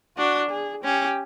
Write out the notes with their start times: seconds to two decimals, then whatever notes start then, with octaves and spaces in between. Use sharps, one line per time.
0.17 D4 F#4
0.51 G#4
0.84 C#4 G4